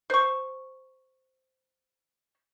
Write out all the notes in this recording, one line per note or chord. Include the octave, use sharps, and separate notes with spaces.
C5 C#6